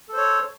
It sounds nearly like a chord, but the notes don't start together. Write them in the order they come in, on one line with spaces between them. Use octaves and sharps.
A4 C5 C#5